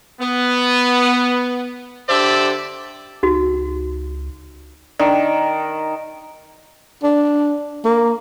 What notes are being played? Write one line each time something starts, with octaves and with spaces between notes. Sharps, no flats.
B3
D3 G4 A4 C5 D5 E5
C#2 D#4 F#4
D#3 D4
D4
A#3